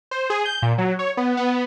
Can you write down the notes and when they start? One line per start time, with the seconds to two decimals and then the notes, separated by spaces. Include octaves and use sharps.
0.11 C5
0.30 G#4
0.45 G6
0.62 A#2
0.78 F#3
0.99 C#5
1.17 B3
1.37 B3